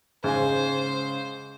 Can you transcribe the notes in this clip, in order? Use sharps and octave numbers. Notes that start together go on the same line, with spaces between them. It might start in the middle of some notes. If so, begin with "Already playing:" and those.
G#2 C#3 C5 G#5